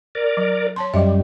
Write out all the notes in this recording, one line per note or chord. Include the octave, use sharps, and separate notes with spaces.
A#4 D5
F#3
C#5 A5 C6
F#2 F#3 G3 D#5 E5